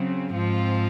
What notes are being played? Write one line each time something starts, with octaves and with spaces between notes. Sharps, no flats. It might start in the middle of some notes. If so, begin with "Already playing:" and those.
Already playing: C#3 F#3 C4
G#2 F3 C4 F4